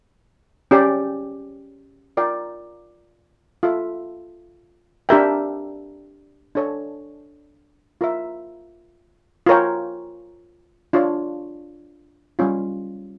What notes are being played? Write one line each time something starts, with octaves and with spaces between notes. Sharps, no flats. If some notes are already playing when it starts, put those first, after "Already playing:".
C#4 G4 D5 G5
F4 A#4 D5 G5
F4 A4 E5
D4 G4 A#4 E5 G5
D4 A4 C#5
F4 A#4 E5
F4 A#4 C#5 G5
D4 F4 C#5
G3 C#4 F4